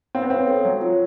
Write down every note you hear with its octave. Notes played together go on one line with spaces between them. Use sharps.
C4 F5
B3
C4 C#5
A4
F#3 C#5
F4